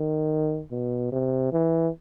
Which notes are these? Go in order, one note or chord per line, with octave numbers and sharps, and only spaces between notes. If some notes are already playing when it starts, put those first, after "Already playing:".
Already playing: D#3
B2
C3
E3